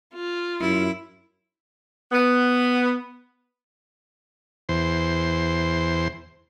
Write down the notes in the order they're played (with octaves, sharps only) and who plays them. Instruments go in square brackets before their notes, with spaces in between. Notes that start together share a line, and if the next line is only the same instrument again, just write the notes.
[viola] F4
[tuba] F#2 [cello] E4
[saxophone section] B3
[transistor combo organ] E2 C5